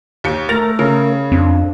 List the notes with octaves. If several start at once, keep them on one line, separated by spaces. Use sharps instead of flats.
D#2 G4 C#7
A3 A#4 A6 A#6 F7
C#3 A#4
F2 C4 D4